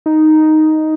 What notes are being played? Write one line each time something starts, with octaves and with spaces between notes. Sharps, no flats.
D#4